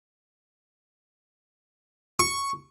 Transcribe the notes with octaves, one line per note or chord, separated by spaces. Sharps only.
C#6